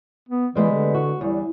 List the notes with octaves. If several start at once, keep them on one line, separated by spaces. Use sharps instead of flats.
B3
E3 G3 G#3 B3
D3
F#4
E2 G3